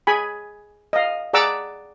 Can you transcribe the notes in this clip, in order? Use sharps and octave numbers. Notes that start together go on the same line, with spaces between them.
G#4 G#5 B5
D#5 F5
G#4 D5 F#5 A#5 D6 E6